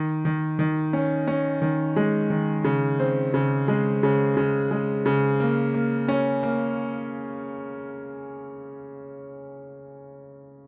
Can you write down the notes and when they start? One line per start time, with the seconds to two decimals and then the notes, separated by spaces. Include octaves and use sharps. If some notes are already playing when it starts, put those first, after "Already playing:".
Already playing: D#3
0.25 D#3
0.59 D#3
0.93 C#4
1.27 C#4
1.62 D#3
1.96 G#3
2.30 D#3
2.64 C#3
2.99 C4
3.34 C#3
3.68 G#3
4.03 C#3
4.37 C#3
4.71 G#3
5.06 C#3
5.40 A#3
5.74 A#3
6.08 C#4
6.43 A#3